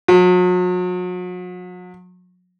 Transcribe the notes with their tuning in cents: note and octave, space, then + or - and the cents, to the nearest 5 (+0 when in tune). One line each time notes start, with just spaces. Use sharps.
F#3 -40